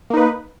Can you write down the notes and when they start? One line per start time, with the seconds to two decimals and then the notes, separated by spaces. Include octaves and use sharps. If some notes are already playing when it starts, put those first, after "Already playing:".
0.10 A#3
0.14 D#4
0.17 B4